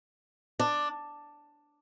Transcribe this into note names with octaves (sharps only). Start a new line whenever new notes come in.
D4